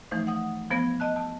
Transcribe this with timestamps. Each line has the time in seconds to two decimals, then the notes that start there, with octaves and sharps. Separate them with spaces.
0.11 E3 F3 A3 D#4 C5
0.27 F#5 D#6
0.71 F3 B3 C5 G#6 A#6
1.00 D#5 A5 F#6
1.16 A5